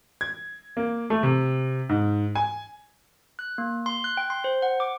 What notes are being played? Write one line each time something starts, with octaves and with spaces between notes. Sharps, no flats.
G#6
A#3
A3
C3
G#2
G#5
F#6
A#3
C6
F#6
G5
C6
C5
F#5
D6